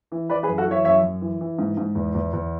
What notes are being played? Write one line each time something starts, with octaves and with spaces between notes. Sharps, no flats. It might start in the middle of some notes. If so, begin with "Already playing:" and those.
E3
E3 B4 D5
G#4 B4
F#2
F#4 A4
E3 C#5 E5
F#2 C#5 E5
F#2
E3
E3
G#2
G#2
E2
E2
E2